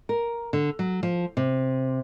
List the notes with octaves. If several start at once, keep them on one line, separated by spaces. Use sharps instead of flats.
A#4
D3
F#3
F3
C3